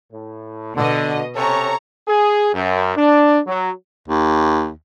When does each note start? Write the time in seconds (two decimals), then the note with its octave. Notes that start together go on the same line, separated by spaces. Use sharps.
0.12 A2
0.76 B2 D3 D#5
1.36 C3 C#4 A4 C#5 A#5 C#6
2.08 G#4
2.54 F#2
2.96 D4
3.47 F#3
4.08 D#2